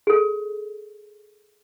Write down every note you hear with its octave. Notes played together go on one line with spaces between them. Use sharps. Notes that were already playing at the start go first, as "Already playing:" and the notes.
G#4 A4